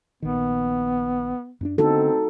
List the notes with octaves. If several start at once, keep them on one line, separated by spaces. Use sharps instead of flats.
A#1 D#3 B3
F#2 C#4 D4
D3 B3 C4 D4 D#4 F#4 A4